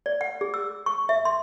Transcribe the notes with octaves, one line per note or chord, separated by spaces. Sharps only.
D5
F#5
G#4
E6
C#6
E5
C6